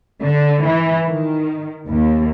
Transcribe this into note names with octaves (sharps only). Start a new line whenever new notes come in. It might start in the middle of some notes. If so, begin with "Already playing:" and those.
D3
E3
D#3
D#2